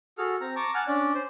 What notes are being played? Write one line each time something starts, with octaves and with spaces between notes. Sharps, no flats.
F#4 G#4 A4 F6
C4 A#5
A5 A#5 C#6 D6
F#5 G#5 A5 F6
C#4 D4 D5
C5